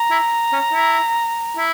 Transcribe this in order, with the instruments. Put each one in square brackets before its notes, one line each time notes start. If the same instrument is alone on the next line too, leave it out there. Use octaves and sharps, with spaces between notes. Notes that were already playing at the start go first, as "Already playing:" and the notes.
Already playing: [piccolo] A#5
[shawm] E4
C#4
E4
E4